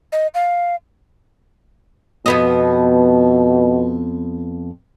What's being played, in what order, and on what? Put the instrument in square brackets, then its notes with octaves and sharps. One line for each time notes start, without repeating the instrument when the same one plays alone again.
[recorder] D#5
F5
[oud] F2 B3 D#5 [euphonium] B2